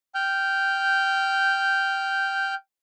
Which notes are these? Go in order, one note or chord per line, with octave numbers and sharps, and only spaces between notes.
G5 F6 G6